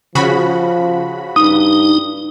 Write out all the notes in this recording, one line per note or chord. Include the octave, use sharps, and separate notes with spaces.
C#3 F3 F#4 B5
G2 D#4 D#6